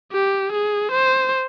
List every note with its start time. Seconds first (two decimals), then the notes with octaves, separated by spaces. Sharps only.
0.12 G4
0.52 G#4
0.92 C5